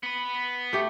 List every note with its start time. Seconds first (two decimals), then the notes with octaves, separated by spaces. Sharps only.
0.03 B3 B4
0.73 A3 G4